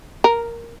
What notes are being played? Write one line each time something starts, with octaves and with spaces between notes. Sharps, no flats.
A#4